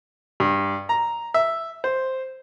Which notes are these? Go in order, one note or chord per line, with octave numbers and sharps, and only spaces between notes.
G2
A#5
E5
C5